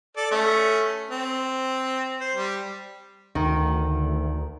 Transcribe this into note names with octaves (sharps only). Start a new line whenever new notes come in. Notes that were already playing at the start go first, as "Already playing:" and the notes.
A4 D5
A3 C#4
C4
C5
G3
D2 D#3